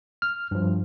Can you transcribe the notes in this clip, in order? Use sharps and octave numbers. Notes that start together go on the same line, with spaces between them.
F6
G2 F3